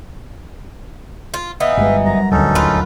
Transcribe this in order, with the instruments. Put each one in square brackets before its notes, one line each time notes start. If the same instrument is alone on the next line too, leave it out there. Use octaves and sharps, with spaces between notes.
[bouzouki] F4
[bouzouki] E3 B3 D#4 [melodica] E5 F5
[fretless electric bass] G1 G#3 [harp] G2
[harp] F#2 [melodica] A#5
[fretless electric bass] D#1 D2 [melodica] C#4 D#4 A4
[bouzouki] F4 B4